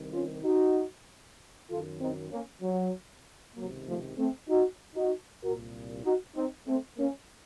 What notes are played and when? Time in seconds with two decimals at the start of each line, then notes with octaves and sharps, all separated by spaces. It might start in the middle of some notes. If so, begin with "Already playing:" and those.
Already playing: C2 C3 D#3
0.13 C#4 F4
0.44 D#4 F#4
1.68 F#2 D#3 F4 A4
1.99 C4 D#4
2.31 A#3 C#4
2.62 F#3
3.55 C#2 C3 D#3 F#3 A#3
3.86 F3 A3
4.18 A3 C4
4.49 D#4 F#4
4.96 D#4 F#4
5.42 C2 A#2 F#4 A#4
6.04 D#4 F#4
6.35 C4 D#4
6.66 A3 C4
6.98 A#3 C#4